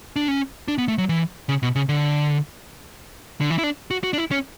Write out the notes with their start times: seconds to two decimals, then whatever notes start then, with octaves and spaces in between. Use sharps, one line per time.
0.16 D4
0.28 C#4
0.68 D4
0.78 B3
0.88 A3
0.98 F#3
1.09 E3
1.49 C#3
1.63 B2
1.76 C#3
1.89 D3
3.41 D3
3.50 E3
3.58 E4
3.63 D4
3.91 F#4
4.04 F#4
4.13 D4
4.18 E4
4.31 C#4